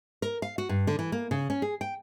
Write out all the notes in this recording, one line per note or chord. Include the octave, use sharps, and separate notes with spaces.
A#4
F5
F#4
G2
D3
E3
A#3
C#3
C#4
G#4
G5